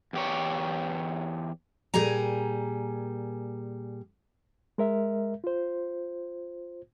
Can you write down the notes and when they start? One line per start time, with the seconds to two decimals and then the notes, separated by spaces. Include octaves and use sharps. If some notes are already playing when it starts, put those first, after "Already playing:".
0.13 E2 G4 C#5
1.94 A#2 G3 G#4 G#5 A#5
4.78 G#3 A#4 E5
5.44 F4 C5